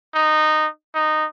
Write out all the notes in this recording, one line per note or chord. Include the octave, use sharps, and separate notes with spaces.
D#4
D#4